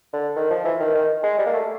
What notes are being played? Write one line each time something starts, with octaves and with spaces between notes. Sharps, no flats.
D3
D#3
F3
E3
D#3
D#3
G#3
G3
A#3
A3